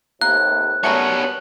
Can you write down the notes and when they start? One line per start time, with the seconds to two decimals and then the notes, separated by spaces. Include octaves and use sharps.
0.21 D#2 A2 C3 A#3 F#6
0.84 G3 A3 B3 C#4 F#4 A#4 C#5